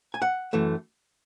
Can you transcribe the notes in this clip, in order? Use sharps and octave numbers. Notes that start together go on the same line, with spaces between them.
G#5
F#5
F#2 E3 A3